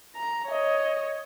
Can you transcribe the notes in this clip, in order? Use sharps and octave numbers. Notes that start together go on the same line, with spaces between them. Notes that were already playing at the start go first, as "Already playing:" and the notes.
A#5
C#5 D#5